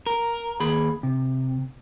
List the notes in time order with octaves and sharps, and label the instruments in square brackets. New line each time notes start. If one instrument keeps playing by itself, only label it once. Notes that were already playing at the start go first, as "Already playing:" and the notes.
[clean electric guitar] A#4
D#2 G#4 B5
C3